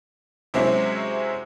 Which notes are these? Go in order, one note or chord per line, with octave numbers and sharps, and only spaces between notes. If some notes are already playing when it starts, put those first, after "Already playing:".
C3 F#3 G#3 C4 C#4 E4